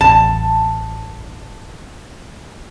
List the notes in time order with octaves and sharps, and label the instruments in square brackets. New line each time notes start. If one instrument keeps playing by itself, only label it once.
[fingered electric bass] A1 E2 [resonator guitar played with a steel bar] A5